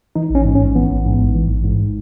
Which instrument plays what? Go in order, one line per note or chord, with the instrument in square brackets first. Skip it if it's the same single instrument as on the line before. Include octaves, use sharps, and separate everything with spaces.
[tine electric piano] E3 D#4
A1 C#4
G#2
C#4
A1
E3 B3
A1
G#2
A1
E3
A1
G#2